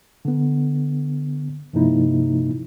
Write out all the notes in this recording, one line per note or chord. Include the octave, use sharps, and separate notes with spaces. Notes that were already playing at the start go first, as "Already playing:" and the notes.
D3 B3
G2 C3 F3 A#3 D#4 E4